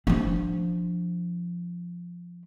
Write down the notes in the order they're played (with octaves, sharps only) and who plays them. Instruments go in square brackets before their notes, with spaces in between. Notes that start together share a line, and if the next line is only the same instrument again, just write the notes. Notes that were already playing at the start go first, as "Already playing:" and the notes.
[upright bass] F3 D4